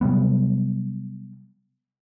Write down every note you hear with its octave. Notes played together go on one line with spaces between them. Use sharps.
C3 F#3 G3 B3